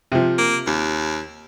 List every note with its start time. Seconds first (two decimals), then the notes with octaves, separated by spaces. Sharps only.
0.12 C3 F3
0.38 A#3
0.67 D#2